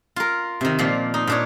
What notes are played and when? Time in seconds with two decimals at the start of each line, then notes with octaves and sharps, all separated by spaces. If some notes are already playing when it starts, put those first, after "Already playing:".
0.16 F4 A#4
0.61 C3 D#3
0.79 A#2 F3 D5
1.14 D#4
1.27 A#2 D4 C#5